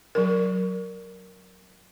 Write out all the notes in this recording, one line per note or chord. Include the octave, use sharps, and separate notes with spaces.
F#3 A#4